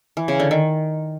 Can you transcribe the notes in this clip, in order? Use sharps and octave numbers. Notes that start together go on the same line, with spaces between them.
E3
C#3
D3
D#3